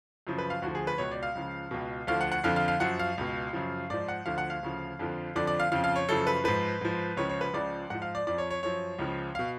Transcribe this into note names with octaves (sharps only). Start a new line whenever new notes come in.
F#2 C#3 F3
B4
F5
D2 D3 F3 F#4
G#4
B4
C#2 B2 C#5
D5
F5
C#2 C#3 F3
C#2 B2
D2 D3 F3 F5
F#5
F#5
F2 D3 F3 F5
F5
F5
F#2 F3 F#5
F5
C#2 B2
F#2 C#3 F3
G#2 F3 D5
F#5
D2 D3 F3 F5
F#5
F5
D2 C#3 F3
F2 D3 F3
F2 D3 F3 D5
D5
F5
F2 C#3 F3 F5
F5
C#5
F#2 C#3 F3 A4
B4
G#2 F3 B4
G#2 F3
C#2 C#3 F3 C#5
C#5
B4
C#2 C#3 F3 D5
G#2 F3 F#5
F5
D5
F2 F3 D5
C#5
C#5
F#2 F3 C#5
C#2 C#3 F3
B2 F5